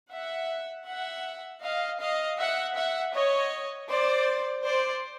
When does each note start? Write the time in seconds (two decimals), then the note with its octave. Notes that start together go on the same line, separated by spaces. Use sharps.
0.12 E5 F#5
0.87 E5 F#5
1.63 D#5 F5
2.00 D#5 F5
2.39 E5 F#5
2.76 E5 F#5
3.14 C#5 D#5
3.89 C5 D5
4.64 C5 D5